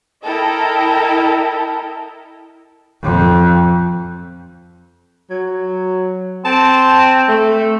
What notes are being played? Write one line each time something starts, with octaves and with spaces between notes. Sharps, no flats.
E4 A4 A#4 D#5 G5
F2
F#3
C4 A5
A3